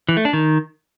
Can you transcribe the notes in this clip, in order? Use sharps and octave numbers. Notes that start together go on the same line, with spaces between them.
E3
A3
D4
D#3